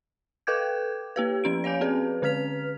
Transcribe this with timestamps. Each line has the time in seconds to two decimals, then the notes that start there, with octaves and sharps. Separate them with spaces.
0.47 A4 B4 G5 D6 G6 G#6
1.16 A#3 G4 B4
1.44 F3 C#4 D7
1.64 C#5 F5 G#5 G6
1.81 C4 G#4 B4
2.22 D3 C#4 B4 F6 B6 F7